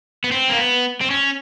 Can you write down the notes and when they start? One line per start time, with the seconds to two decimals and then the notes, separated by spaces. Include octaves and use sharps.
0.24 B3
0.31 C4
0.50 A#3
0.57 B3
1.01 C4
1.10 C#4